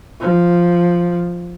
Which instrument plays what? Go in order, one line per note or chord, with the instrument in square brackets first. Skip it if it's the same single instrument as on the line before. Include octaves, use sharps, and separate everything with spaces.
[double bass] F3